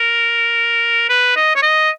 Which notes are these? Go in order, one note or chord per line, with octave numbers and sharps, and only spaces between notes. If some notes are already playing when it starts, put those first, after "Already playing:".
Already playing: A#4
B4
D#5
C#5
D#5